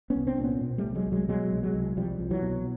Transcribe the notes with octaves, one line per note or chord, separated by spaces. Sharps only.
B3 C#4
C2
C4 D4
A#2
B3 C#4
B2
G3 A3
C2
F#3 G#3
C2
F#3 G#3
B2 F#3 G#3
C2
F#3 G#3
C2
C2 F3 G3
C2
E3 F#3
B2